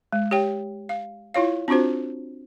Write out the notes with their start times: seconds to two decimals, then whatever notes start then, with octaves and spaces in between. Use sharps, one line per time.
0.13 G#3
0.31 G4 C#5 G5
0.89 F5
1.34 E4 F4 C#5 F5
1.68 C4 D4 F4 F#4 C5